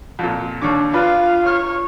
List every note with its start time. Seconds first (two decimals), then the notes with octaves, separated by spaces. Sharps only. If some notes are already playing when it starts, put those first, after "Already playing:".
0.19 F2 A#2
0.62 D#2 D4 C#5 D6
0.93 D4 F4 B4 F5
1.46 C#5 F6